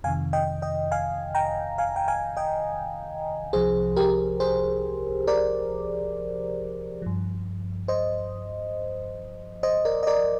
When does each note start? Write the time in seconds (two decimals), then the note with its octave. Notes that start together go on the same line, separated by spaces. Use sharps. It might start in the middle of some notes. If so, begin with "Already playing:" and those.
0.04 F2 C3 D#3 F5 G#5
0.33 D#5 G5
0.62 D#5 G5
0.91 F5 G#5
1.35 G5 A#5
1.78 F5 G#5
1.96 G5
2.08 F5 G#5
2.37 D#5 G5
3.53 C2 C3 F3 G#4 C5
3.96 G4 A#4
4.40 G#4 C5
5.27 A#4 D5
7.02 G2 F3
7.88 C5 D#5
9.63 C5 D#5
9.85 A#4 D5
10.03 D#5
10.07 A#4 D5